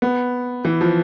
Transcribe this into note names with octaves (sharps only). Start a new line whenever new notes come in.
B3
E3
F3